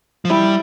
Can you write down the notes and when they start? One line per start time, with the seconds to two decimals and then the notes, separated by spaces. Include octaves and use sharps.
0.25 F3
0.30 G3 E4